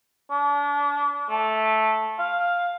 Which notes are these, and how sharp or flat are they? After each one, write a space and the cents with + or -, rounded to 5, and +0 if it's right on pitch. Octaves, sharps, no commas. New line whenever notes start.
D4 -35
A3 -10
F5 +5